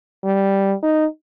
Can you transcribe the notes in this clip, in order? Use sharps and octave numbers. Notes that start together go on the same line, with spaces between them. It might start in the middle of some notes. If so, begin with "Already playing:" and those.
G3
D#4